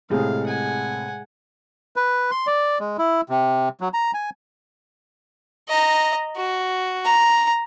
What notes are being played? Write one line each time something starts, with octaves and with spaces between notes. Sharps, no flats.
A2 C3 G#3 G#4 F5
F#5 G#5
B4
C6
D5
G#3
E4
C3
F#3
A#5
G#5
D#5 A#5
F#4
A#5